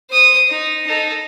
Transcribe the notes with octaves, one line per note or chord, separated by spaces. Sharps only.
C5 D#6
D#4
D#4 A4